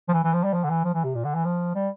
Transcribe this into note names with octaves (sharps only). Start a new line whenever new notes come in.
F3
E3
E3
F3
G3
F3
D3
E3
F3
E3
C3
A#2
D3
E3
F3
G3